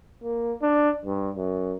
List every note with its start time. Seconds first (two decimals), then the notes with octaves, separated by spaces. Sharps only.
0.23 A#3
0.62 D4
1.05 G2
1.36 F#2